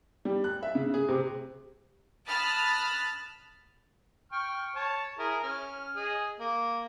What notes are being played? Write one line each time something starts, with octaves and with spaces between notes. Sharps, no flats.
G3
F#6
E5
C#3
G#4
C3
A5 B5 D#6 F6 F#6 A6
G5 C#6 F6
C#5 A5
E4 G#4 A#4
C#4 F6
G#4 D#5
A#3